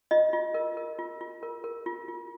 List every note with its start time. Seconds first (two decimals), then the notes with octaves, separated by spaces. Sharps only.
0.11 F4 D#5
0.33 F4
0.54 A#4
0.77 A#4
0.99 F4
1.21 F4
1.43 A#4
1.64 A#4
1.86 F4
2.08 F4